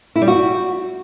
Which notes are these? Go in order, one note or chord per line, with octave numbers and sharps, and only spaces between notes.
E4
G3
F#4